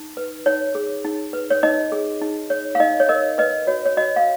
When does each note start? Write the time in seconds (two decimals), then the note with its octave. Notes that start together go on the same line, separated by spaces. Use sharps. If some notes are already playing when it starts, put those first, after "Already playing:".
Already playing: D#4
0.17 B4
0.46 D#4 C#5
0.75 G#4
1.05 D#4
1.33 B4
1.50 C#5
1.63 D#4 D#5
1.92 G#4
2.21 D#4
2.50 C#5
2.75 F5
2.80 D#4 D#5
3.00 C#5
3.09 A#4 D#5
3.38 B4 D#5
3.67 F#4 C#5
3.85 C#5
3.97 F#4 D#5
4.16 F5